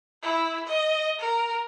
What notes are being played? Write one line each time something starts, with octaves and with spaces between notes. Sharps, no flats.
E4
D#5
A#4